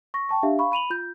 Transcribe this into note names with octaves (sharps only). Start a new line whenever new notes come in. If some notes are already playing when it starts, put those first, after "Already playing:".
C#6 A#6
G5 A5 C#6
D4 G4 E5 F5
F5 B5 C#6
B5 D#7 F7 F#7
F4 G6